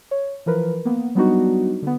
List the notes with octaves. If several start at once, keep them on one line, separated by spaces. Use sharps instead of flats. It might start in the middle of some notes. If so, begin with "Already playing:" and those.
C#5
E3 F3 A#4 B4
A#3 B3
F#3 G3 B3 D4 D#4 F#4
D3 B3